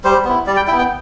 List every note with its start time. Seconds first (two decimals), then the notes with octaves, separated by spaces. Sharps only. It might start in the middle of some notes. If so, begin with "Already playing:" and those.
0.04 G3 C5
0.25 B3 E4
0.47 G3 D5
0.56 G5
0.67 E4 G5
0.72 B3
0.79 G5